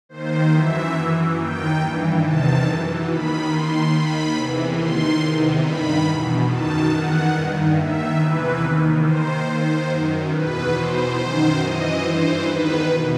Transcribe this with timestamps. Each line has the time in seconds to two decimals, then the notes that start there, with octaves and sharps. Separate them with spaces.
0.09 D#2 D#3 C5
0.52 F#2 E3 E5
0.94 F#2 E3
1.37 D#2 D#3 G5
1.80 G2 E3
2.22 E2 C3 D#3 A5
2.65 F#2 E3
3.08 D#2 D#3 B5
3.50 D#2 D#3 C6
3.93 D#2 D#3 B5
4.36 E2 C3 E3
4.77 D#2 D#3 C6
5.21 E2 C3 D#3
5.63 G2 D#3 B5
6.05 E2 B2
6.47 F#2 D#3 A5
6.91 E2 D#3 F#5
7.33 G2 D#3
7.75 D#2 D#3 E5
8.18 E2 C3 E3 B4
8.61 D#2 D#3
9.03 D#2 D#3 C5
9.46 D#2 D#3 C5
9.88 F#2 D#3
10.31 E2 B2 B4
10.73 E2 B2 C5
11.16 F#2 D#3 C5
11.59 F#2 E3 D#5
12.01 G2 E3 C5
12.43 E2 D#3 B4
12.86 E2 B2